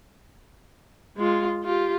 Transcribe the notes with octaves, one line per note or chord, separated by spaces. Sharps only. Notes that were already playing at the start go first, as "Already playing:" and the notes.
G#3 F4
F4 G4